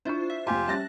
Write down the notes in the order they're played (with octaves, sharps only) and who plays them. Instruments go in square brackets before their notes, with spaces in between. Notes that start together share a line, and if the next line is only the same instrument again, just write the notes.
[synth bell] D4 F4 C5 [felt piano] E4 C#6
[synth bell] E5
[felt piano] F1 G#5 [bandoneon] F4 G4
[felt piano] G3 C#4 A6 [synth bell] A5 F#6 A#6